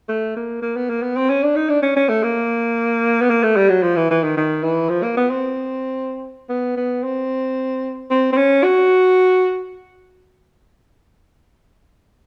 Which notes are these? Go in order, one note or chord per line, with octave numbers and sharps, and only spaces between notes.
A3
A#3
A#3
B3
A#3
B3
C4
C#4
D4
D#4
D4
C#4
C#4
A3
A#3
B3
A#3
A3
G3
F#3
F3
E3
E3
D#3
D#3
E3
F3
A#3
B3
C4
B3
B3
C4
C4
C4
C#4
F#4